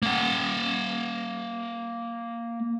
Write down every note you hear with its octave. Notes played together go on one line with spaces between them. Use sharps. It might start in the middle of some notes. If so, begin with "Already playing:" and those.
A#3 F#5